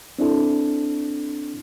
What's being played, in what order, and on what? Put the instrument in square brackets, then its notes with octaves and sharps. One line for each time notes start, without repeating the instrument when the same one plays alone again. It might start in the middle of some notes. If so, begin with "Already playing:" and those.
[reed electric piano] C4 D4 E4 A4